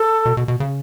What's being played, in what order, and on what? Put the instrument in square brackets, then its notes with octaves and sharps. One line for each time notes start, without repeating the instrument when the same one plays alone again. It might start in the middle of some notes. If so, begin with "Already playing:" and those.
Already playing: [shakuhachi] A4
[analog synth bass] B2
B2
B2
C#3